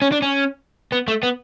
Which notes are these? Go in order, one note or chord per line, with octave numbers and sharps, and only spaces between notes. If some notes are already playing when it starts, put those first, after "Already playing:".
C#4
D4
C#4
B3
A3
B3